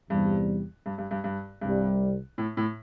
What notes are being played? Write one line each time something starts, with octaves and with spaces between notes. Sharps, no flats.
E2 G2 C3 G3
G2
G2
G2
G2
C2 G2 C3 G3
A2
A2